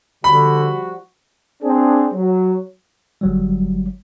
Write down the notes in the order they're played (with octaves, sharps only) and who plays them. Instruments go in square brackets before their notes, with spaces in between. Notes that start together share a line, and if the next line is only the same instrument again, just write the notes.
[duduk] D3 [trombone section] F3 G3 F#4 [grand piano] B5
[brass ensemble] C4 D4 G#4
F#3
[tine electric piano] G1 F#3 G3